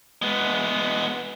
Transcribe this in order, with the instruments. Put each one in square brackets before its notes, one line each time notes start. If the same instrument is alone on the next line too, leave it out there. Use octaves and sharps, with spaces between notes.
[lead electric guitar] G#3 B3